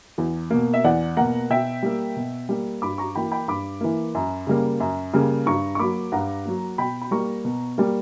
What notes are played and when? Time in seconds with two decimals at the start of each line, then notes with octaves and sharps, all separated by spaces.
0.18 E2
0.51 B2 A#3
0.73 E5
0.84 E2 D5 F#5
1.17 B2 A#3 F#5 A#5
1.50 B2 E5 G5
1.83 G3 A#3
2.16 B2
2.49 G3 A#3
2.82 G2 B5 D6
2.98 A#5 C#6
3.15 E3 A#3 G5 B5
3.32 G5 B5
3.48 G2 B5 D6
3.81 E3 A#3
4.15 F#2
4.47 C#3 G3 A#3
4.80 F#2
5.13 C#3 G3 A#3
5.46 G2 A#5 C#6
5.75 C#6
5.79 F#3 A#3 B5 D6
6.12 G2 F#5 A#5
6.45 F#3 A#3
6.78 B2 G5 B5
7.02 B5
7.11 G3 A#3 A#5 C#6
7.45 B2
7.78 G3 A#3